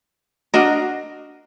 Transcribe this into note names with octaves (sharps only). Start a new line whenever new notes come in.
D4 F#4 A#4 D#5